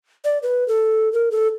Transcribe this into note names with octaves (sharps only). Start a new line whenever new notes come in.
D5
B4
A4
A#4
A4